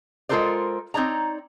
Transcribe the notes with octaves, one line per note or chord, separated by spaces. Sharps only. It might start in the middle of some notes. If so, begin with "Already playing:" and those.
G#3 F4 A4 A#4 C5 D5
C4 D#4 C#5 D5 A#5